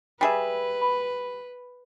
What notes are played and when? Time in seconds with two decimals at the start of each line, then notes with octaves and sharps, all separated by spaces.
0.21 G3 G#4 B4 E5
0.82 B5